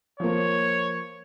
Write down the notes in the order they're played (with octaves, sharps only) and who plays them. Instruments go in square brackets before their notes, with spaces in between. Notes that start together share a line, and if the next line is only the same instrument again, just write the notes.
[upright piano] F3 A#3 [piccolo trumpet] C#5